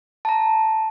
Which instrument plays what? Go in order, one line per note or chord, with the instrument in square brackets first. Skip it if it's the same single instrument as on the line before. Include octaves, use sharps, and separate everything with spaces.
[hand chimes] A5 A#5